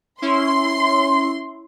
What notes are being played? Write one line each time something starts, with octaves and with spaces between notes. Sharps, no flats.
C#4 E4 C6